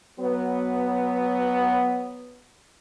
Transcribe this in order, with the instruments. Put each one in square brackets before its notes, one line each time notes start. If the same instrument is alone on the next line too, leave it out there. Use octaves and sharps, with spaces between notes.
[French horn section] F#3 B3